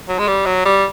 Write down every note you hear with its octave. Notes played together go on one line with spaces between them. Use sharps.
F#3
G#3
G3
F#3
G3